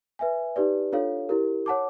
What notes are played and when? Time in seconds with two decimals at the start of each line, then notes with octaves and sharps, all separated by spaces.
0.19 B4 E5 G#5
0.56 D#4 G4 B4 D5
0.92 D4 F4 A4 C#5 F5
1.29 E4 G4 A#4
1.66 C#5 F#5 A5 D6